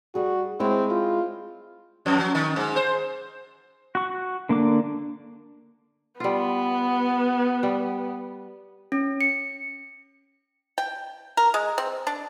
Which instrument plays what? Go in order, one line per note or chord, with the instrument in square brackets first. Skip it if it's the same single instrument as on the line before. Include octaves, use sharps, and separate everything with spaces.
[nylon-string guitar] G3 G#4 [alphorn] F#4
[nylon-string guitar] G#3 E4 C#5 [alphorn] C4
[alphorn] F4
[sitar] F2
F#3
D#3
G#2
C5
[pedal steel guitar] F#4 C#6
D3 A#3 D4 D6
[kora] G3 F4 [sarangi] B3
[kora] G3
[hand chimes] C#4
C#7
[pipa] G5
A#4
G#3
C4
D4